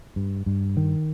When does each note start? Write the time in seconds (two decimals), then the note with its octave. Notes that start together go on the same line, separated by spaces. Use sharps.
0.16 G2
0.46 G2
0.77 D#3